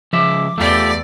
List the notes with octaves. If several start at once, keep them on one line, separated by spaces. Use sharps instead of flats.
C#2 F3 G#3 E5 D6
E2 A3 F4 G4 D5 E6